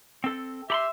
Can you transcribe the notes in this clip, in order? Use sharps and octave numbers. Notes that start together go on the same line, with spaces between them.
C4 A4
G4 E5 B5 C6